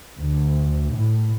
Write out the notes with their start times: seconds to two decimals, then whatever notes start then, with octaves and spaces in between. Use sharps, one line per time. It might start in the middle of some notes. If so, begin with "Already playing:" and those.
0.18 D2
0.92 A2